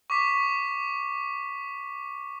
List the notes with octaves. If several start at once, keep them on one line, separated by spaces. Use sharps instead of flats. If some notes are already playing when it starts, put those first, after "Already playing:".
C#6 D6 B6